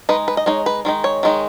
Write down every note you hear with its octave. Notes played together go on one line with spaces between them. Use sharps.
G#3 D#4 B4
B4
D#5
G#3 D#4 C#5
B4
D#3 G#3 D#4
C#5
D#3 G#3 D#4